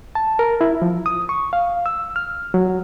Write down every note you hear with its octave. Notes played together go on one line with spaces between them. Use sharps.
A5
A#4
E4
F3
D#6
C#6
F5
E6
F6
F#3